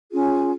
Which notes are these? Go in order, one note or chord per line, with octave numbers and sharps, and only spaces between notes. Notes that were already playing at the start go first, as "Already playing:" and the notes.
C#4 F4 G#4